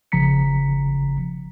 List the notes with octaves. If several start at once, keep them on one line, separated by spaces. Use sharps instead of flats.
G1 C#3 F3 A#5 B6 C#7